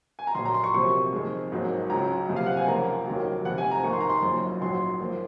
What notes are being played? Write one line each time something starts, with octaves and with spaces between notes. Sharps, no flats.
G#5
A#5
A#1 A#2 F#3 C6
A#5
C6
C#6
F2 C3 F#3 A#3 C#6
F2 D#3 G#3
G#1 G#2 F#3 A#3
C#2 C#3 F#3 A#5
F#1 F2 C3
F5
F#5
G#5
C#2 C#3 F3 A#3 A#5
F1 D#2 D#3 F#3 A#3
F1 F2 C3 F#5
G#5
A#5
G#1 G#2 D#3 A#3 C#6
C6
A#5
C6
F#1 F#2 C#3 F3
A#1 G#2 F#3 C6
F3 A#3